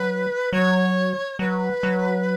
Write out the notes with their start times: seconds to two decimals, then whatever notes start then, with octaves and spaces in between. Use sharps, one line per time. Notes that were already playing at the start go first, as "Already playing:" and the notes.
Already playing: F#3 B4
0.53 F#3 C#5
1.39 F#3 B4
1.83 F#3